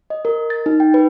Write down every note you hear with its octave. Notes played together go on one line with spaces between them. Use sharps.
D#5
A#4
A6
D#4
G5
B4